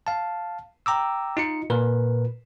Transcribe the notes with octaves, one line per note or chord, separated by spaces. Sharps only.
F5 A5
G5 A#5 D6 E6
D#4 F4 C#7
A#2 A#4 B4